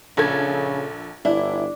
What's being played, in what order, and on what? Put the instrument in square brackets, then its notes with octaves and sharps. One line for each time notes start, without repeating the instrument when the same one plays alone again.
[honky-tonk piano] A#1 A4 G#6 [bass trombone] C#3
[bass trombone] G1 [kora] D4 [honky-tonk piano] E4